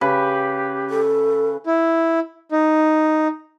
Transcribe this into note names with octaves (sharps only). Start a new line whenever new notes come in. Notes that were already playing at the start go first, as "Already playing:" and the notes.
C#3 G4 B4
A4
E4
D#4